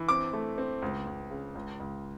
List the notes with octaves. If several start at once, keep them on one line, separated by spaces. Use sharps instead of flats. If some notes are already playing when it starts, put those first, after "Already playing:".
Already playing: E3
C4 D6
A3
C4
C#2
C#2
C#3
C#2
C#2